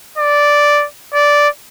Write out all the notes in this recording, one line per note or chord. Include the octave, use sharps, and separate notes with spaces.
D5
D5